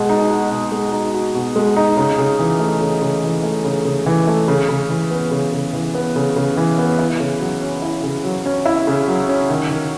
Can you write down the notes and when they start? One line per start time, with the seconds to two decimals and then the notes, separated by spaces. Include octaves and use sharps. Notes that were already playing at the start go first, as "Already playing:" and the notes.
Already playing: B2 G#3
0.09 D#4
0.29 F#4
0.50 B2
0.72 G#3
0.92 D#4
1.14 F#4
1.35 B2
1.56 G#3
1.76 D#4
1.97 C#3
2.18 C#3
2.39 E3
2.60 A3
2.81 C#3
3.02 C#3
3.23 E3
3.43 A3
3.64 C#3
3.85 C#3
4.06 E3
4.27 A3
4.48 C#3
4.69 C#3
4.90 E3
5.11 B3
5.31 C#3
5.53 C#3
5.73 E3
5.94 B3
6.16 C#3
6.36 C#3
6.57 E3
6.78 B3
6.98 E4
7.20 C#3
7.40 F#3
7.62 C#4
7.82 E4
8.03 C#3
8.24 F#3
8.46 C#4
8.66 E4
8.87 C#3
9.08 F#3
9.29 C#4
9.50 D#3
9.71 D#3